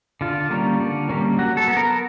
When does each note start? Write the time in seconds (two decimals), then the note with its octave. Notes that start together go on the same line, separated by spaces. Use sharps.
0.21 D3 F4
0.51 G3 A#3 C#4
0.80 D3
1.09 G3 A#3 C#4
1.39 F#3 F#4
1.57 A4
1.68 B3
1.77 A#4